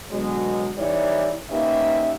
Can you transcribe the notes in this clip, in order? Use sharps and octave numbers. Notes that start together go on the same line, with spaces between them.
B2 D3 F#3 G#3
E3 G3 D#4 E4 C#5 D5
A#3 C#4 D#4 G4 B4 E5